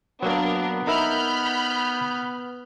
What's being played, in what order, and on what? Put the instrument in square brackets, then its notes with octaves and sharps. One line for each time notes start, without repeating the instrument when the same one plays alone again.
[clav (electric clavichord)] F#3 A#3 [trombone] B3 [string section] D4 A#4
[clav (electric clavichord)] D#4 A#4 E5 [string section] B5 F6 G6